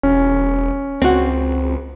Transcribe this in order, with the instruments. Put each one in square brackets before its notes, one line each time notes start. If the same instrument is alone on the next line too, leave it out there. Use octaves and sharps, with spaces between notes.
[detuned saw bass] E1 [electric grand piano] C#4
[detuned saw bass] C#2 [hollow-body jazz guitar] C4 F#4